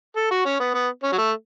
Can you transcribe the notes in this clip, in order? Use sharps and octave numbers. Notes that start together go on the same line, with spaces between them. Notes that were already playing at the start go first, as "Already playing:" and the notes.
A4
F#4
C#4
B3
B3
C#4
F#3
A3